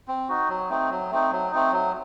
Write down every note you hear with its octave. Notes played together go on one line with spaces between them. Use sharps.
C4
D#4 F#4
F#3
A3 C4 D#4
F#3
A3 C4 D#4
F#3
A3 C4 D#4
F#3